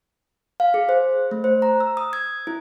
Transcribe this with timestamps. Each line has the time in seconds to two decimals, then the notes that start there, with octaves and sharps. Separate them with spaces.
0.60 F5
0.74 G#4
0.89 C5
1.31 A3
1.44 C5
1.62 A#5
1.80 E6
1.97 D#6
2.13 G#6
2.47 E4